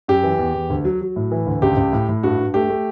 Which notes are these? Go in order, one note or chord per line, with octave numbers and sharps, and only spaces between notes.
F#2 G4
E3
E2
E2
D2
F#3
F#3
A2
E3
D2
C#2 G4
C#2
A2
A2
G2 F#4
G2
A3 G4
A3